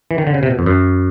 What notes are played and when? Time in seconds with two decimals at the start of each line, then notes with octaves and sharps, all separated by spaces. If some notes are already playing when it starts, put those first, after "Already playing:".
0.11 E3
0.18 D#3
0.27 D3
0.34 C#3
0.43 C3
0.51 B2
0.59 F2
0.66 F#2